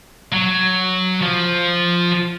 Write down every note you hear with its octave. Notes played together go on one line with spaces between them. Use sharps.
F#3
F3